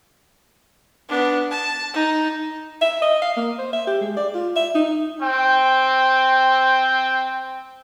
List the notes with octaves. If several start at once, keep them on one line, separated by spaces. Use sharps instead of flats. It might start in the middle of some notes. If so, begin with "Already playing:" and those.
B3 D4
A5
D#4
E5
D#5
F5
A#3
C5
E5
G4
G#3
D5
F4
E5
D#4
C4 G5